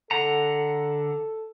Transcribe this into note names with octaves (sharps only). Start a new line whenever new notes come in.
D3 A4 F#5 A#5